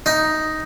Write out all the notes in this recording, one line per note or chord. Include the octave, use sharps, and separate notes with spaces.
D#4